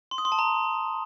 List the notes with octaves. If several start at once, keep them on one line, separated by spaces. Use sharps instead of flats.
C6
D#6
C6
A5
A#5